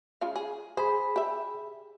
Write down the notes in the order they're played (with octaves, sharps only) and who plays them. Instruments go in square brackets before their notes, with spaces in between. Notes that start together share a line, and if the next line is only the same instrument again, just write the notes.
[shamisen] C#3 F4 F5
G#4
[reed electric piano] G#4 B5 [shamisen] C5
[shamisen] G4 E5